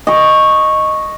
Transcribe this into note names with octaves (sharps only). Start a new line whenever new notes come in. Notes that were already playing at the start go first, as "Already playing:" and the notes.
D#5 C#6